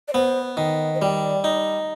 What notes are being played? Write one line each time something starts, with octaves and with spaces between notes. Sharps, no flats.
D5
B3 C5
D#3
C5
G3 D5
D#4